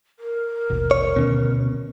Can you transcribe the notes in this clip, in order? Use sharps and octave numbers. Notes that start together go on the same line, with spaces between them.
A#4
A1 D#2 B2
C#5
D2 B2 D#3 C#4